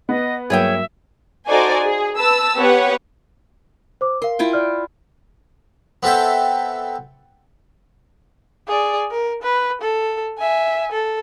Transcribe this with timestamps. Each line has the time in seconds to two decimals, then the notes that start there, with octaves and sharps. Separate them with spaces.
0.09 B3 D#5
0.50 G2 F#3 A#3 G#4 C#5 E5 G5
1.48 D#4 F#4 A4 C5 D5 G#5
1.82 G#4
2.17 B4 A5 E6
2.56 B3 G4 B4 C#5 F#5
4.01 C5 D6
4.22 A#4 F5 C6
4.39 E4 F4 G5
4.53 D5 F6
6.03 B3 C4 A4 E5 G5
8.68 G#4 D5
9.11 A#4
9.42 B4
9.81 A4
10.38 E5 G#5
10.92 A4